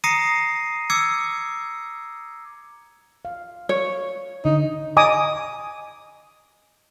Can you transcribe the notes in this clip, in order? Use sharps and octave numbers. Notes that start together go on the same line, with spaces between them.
A#5 D#6 A#6 C7 C#7 D#7
D6 E6 G#6 C#7
F5
C#5
D3 D#4
D#5 G#5 A#5 D6 D#6